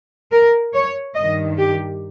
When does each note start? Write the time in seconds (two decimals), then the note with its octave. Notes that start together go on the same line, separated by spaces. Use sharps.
0.32 A#4
0.74 C#5
1.15 G2 D#3 D#5
1.57 G4